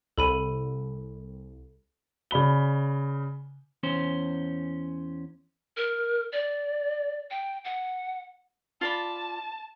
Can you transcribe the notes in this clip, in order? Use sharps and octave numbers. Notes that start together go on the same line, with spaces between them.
C2 A4 B5 D#7
C#3 D5 B5 G7
E2 C#4 C5
A#4
D5
G5
F#5
F4 D5 A5 B5